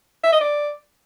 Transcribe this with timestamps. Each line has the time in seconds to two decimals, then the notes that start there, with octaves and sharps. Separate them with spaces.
0.24 E5
0.32 D#5
0.41 D5